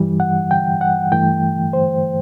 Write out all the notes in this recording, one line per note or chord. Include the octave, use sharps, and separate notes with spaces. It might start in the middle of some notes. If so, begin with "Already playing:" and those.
Already playing: G2 E3 G3
F#5
G5
F#5
G2 E3 A3 G5
C5